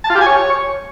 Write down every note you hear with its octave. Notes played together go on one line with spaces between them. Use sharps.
A5
F4
G4
G#5
C#5